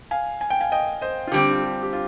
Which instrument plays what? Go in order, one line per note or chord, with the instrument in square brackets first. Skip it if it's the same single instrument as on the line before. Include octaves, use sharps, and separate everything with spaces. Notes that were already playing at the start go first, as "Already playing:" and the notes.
[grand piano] F5 G#5
G#5
G5
F5 G#5
D#5 G5
C5 D#5
F4
[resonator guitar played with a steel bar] D3 G3 C4 [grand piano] G4
[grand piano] F4
G4
G4
F4